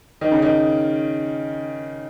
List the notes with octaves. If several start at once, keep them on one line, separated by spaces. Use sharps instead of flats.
D#3
C#3
D#3